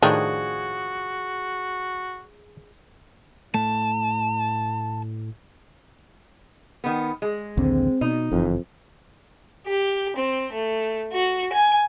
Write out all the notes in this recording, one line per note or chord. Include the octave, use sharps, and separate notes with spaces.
A2 D#3 F3 D4 F#4 G#4
A2 A3 A5
D#3 B3
G#3
A#1 D#2 D3 C4
B2 D#4
F#1 F2 C3 E3
G4
C4
A3
F#4
G#5